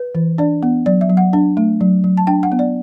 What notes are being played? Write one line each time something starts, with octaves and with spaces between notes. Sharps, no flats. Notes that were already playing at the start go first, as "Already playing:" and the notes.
Already playing: B4
E3
D4 D5
B3
F#3 D5
E5
F#3
F#5
D4
A3
F#3
F#3
A5
D4 G5
F#5
B3
D5